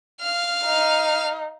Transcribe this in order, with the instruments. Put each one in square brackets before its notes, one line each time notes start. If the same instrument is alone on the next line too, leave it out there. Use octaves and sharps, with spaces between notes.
[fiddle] F5 F6
[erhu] D#4